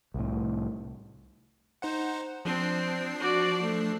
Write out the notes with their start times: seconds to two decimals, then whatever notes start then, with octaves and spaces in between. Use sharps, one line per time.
0.14 C2 A2
1.82 D#4 C5 F#5
2.45 F3 C4 D4 C7
3.20 F#4 D5
3.62 A3